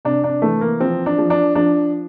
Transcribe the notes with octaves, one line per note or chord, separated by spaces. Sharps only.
C3 D4
D4
E3 A3
A#3
F3 C4
D4
F3
D4
F3 D4